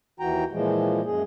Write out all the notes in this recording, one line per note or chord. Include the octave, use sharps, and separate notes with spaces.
D#2 E3 F#4 G5 A#5
A#2 E3 F3 G#3
F#2 G#3 G#4